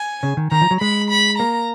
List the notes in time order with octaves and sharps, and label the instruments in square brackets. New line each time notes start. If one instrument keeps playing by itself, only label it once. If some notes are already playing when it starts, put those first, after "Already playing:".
Already playing: [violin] G#5
[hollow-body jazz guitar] C#3
D#3
[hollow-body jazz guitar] D#3 [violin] A#5
[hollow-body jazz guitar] F3
F#3
[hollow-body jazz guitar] G#3 [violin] B5
[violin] B5
[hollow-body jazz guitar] A#3 [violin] A#5